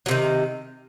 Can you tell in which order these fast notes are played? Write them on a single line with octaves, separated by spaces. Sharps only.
F#3 C3 D#3